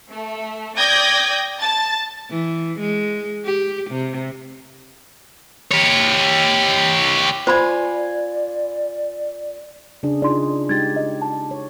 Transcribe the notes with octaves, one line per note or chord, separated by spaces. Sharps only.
A3
D5 G5 D#6 G6 G#6 A#6
A5 A6
E3
G#3
G4
C3
G4 C#5
F4 C5 D5 G#5 B5
C#3 D4 G#4
D#4 F4 G#4 D5 C6
G#3 D#4 G4 G#6 A6
D#5
A5
C#5